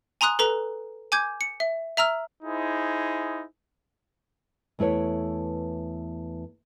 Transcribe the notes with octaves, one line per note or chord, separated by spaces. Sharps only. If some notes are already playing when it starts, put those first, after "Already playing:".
G#5 A#5 C6 D#6 F#6
A4 B4 A#5
G#5 D6 G6 G#6
C#7
E5
E5 A#5 E6 F6
D#4 E4 G#4 C5
E2 A3 E4 B4 C#5